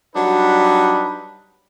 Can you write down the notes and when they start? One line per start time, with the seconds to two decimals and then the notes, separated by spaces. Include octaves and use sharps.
0.15 F#3 G3 D4 D#4 B4